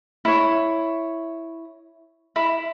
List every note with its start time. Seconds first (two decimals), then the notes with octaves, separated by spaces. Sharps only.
0.25 E4 C#5
2.36 E4 B5